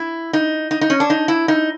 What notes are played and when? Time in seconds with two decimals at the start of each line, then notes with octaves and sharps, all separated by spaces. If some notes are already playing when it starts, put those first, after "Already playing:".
Already playing: E4
0.33 D#4
0.71 D#4
0.81 D#4
0.90 C#4
1.00 D4
1.10 D#4
1.28 E4
1.48 D#4